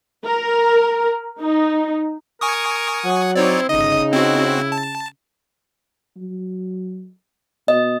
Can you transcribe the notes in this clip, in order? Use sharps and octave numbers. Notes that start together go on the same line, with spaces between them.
A#4
D#4
A#4 G#5 C#6 D#6
F#3 F#5
C4 D#4 E4 C#5 D5
G1 C#3 D#4 D#5 D#6
C4 E4 F#4
A5
F#3
B2 D#5